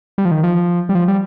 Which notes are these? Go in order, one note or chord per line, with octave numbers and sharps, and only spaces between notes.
G3
F3
D#3
F3
G3
F3
G3